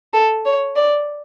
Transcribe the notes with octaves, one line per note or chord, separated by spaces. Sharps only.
A4
C#5
D5